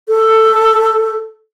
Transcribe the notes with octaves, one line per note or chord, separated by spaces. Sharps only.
A4